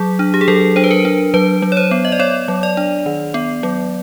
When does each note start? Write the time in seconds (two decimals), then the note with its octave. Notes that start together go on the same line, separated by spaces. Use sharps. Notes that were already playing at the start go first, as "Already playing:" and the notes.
Already playing: F#3 G#4
0.19 D4
0.34 G4
0.41 G#4
0.48 F#3 A4
0.76 D4 C5
0.84 B4
0.91 A#4
1.05 D4
1.34 F#3 B4
1.62 F#3
1.72 C#5
1.77 C5
1.91 B3
2.05 D#5
2.12 D5
2.19 B3 C#5
2.48 F#3
2.63 D5
2.77 D4
3.06 D#3
3.34 B3
3.63 F#3